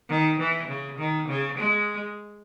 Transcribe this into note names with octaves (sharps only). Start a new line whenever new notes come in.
D#3
E3
C#3
D#3
C#3
G#3